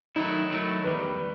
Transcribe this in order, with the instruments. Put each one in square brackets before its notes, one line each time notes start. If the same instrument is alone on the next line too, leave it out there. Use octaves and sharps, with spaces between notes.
[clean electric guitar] D#3 F#3 A3 E4 [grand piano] D#4
[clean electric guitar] D#3 F#3 A3 E4
[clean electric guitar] E2 D#3 G3 [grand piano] B4